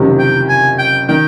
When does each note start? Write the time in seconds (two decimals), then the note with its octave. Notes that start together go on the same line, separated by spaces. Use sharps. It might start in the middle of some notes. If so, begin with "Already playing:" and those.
Already playing: F#1 F2 C3 D#3
0.19 G5
0.49 G#5
0.79 G5
1.08 D#3 G5